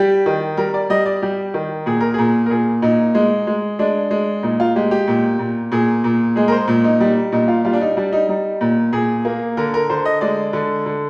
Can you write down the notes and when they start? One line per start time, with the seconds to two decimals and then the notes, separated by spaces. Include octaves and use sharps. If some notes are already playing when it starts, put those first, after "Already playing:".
Already playing: G3 G4
0.26 D#3
0.57 G3 A#4
0.74 D5
0.90 G3 D#5
1.06 D5
1.22 G3 G4
1.54 D#3
1.86 A#2 G#4
2.00 A#4
2.14 A#2 G#4
2.46 A#4
2.50 A#2 G#4
2.82 A#2 D#4
3.15 G#3
3.47 G#3
3.79 G#3 D4
4.11 G#3
4.43 A#2 D#4
4.60 F4
4.76 G#3 G4
4.91 G4
5.08 A#2
5.39 A#2
5.72 A#2 G#4
6.04 A#2
6.36 G#3 G#4
6.48 A#4
6.52 C5
6.68 A#2
6.84 D#4
7.00 G3 D#4
7.32 A#2 D#4
7.48 F4
7.65 G3 F4
7.73 D4
7.81 D#4
7.97 G3 D4
8.12 D#4
8.29 G3 D#4
8.61 A#2
8.93 A#2 G#4
9.25 A#3
9.57 D3 A#4
9.74 A#4
9.90 D3 C5
10.05 D#5
10.21 G#3 D5
10.53 D3
10.86 D3